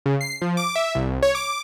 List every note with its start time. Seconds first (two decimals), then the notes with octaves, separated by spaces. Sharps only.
0.06 C#3
0.21 C7
0.42 F3
0.57 D6
0.75 E5
0.95 C2
1.22 C#5
1.35 D6